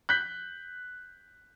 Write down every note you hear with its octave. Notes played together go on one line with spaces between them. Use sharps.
F#6 G6 B6